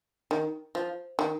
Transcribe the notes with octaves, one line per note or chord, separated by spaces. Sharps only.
D#3
F3
D#3